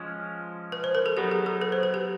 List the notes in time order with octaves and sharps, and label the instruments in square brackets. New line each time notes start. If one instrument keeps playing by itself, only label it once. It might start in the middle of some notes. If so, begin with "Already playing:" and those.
Already playing: [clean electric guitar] F3 G#3 C#4
[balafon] B4
C5
A#4
A4
[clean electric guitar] F#3 B3 D#4 [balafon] G4
[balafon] G#4
A4
B4
C5
B4
G4